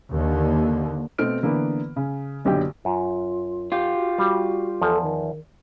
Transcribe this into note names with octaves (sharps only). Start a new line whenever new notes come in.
D#2 D3
B2 A3 C4 F6 D7
D3 E3 A#3 B3
C#3
F#1 B1 D3 G4 G5
F#2 F4
F4 G4
F#4
G3 F#4
E2 F3 A4
D#3